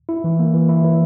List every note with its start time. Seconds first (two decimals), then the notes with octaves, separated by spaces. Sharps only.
0.09 E4
0.24 E3
0.39 A#3
0.54 E3
0.69 E4
0.84 E3